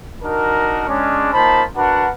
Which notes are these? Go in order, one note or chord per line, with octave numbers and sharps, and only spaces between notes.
D4 D#4 F#4 A#4
G#3 C#4 D4
A#3 D#4 F4 C5 A5 B5
D4 F#4 A#4 B4 F#5